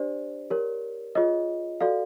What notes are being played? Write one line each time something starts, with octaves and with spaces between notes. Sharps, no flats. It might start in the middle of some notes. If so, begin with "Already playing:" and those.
Already playing: D4 G4 C5 D5
G4 A#4 C#5
F4 G#4 C#5 D#5
F#4 A4 D5 F5